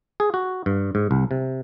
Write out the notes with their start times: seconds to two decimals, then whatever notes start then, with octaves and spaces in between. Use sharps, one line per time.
0.20 G#4
0.34 F#4
0.66 G2
0.95 G#2
1.11 C2
1.31 C3